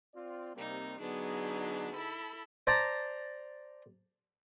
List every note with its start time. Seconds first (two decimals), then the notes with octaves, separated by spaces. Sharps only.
0.14 C4 F4 D5
0.56 C3 G3 A#3 C4 D#4
0.99 D3 F#3 B3 D4 D#4 G#4
1.95 E4 A4 B5
2.67 C5 D5 A5 A#5